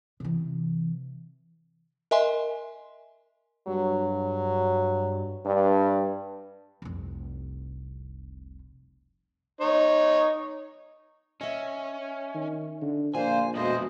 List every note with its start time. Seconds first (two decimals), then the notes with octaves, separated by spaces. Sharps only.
0.20 C3 E3
2.11 A#4 D#5 E5 G#5 C6
3.67 G2 F#3
5.46 G2 D4
6.82 F1 C2
9.61 D#4 C#5
11.41 C#4 D#5 E5
12.34 D#3
12.81 D3
13.15 A#1 A#3 D4 F4 C5 G#5
13.55 F2 B2 G#3 A3 B3 C5 D#5